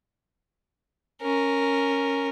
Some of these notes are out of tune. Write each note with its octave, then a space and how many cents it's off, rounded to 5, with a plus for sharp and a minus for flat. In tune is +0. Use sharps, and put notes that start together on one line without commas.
C#4 +0 A#4 -5